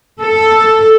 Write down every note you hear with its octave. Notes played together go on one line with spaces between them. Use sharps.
A4